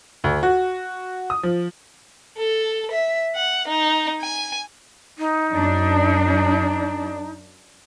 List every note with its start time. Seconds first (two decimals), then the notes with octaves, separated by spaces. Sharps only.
0.24 D2
0.43 F#4
1.30 D#6
1.43 F3
2.38 A4
2.92 E5
3.36 F#5
3.68 D#4
4.22 G#5
5.18 D#4
5.53 F#2 D4